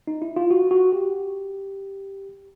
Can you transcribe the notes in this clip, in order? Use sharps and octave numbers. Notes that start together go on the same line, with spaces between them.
D#4
E4
F4
F#4
F#4
G4